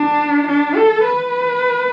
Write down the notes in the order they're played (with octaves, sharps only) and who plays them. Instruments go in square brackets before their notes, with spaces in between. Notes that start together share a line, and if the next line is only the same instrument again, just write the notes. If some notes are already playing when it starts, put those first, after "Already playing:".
Already playing: [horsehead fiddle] D4
D4
A4
B4